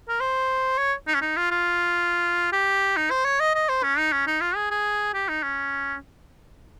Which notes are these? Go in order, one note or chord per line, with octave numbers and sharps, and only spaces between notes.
A#4
C5
C#5
D#4
C#4
D#4
F4
F4
G4
D#4
C5
C#5
D#5
D#5
C5
C#4
D#4
C#4
D#4
F4
G#4
G#4
G4
D#4
C#4